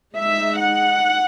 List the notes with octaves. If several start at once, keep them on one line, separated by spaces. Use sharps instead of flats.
G#3 D#4 E5
F#5